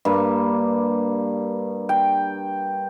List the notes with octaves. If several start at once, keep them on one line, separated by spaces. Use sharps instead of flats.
G2 A#3
G5